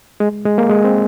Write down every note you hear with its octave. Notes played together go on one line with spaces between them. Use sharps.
G#3
G#3
A#3
G#3
C4